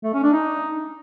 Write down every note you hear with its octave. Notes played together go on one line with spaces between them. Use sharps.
A3
C#4
D4
D#4